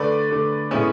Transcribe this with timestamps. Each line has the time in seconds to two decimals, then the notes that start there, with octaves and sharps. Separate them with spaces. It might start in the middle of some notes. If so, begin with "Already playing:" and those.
Already playing: D3 A3 B4 D5
0.31 D3 A3
0.71 A2 G#3 B3 C#4 E4